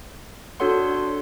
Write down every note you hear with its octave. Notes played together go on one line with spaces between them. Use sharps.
D4 F#4 A4 C#5 F#5 C6